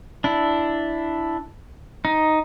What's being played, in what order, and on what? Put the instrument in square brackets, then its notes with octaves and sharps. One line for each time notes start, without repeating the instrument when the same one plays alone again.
[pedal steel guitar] D4 E4
D#4